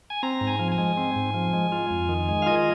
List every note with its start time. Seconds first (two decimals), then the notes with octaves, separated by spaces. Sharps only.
0.10 G#5
0.23 C4 A#5
0.41 G#2
0.47 G#5
0.59 F3
0.72 G#5
0.78 G#3
0.97 C4
1.16 G#2
1.34 F3
1.53 G#3
1.72 F4
1.90 F2
2.09 D#3
2.29 G#3
2.42 F5
2.46 F4 D#5